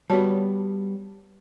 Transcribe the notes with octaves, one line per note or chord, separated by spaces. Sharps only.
G3 B3 F#4 C#5 A5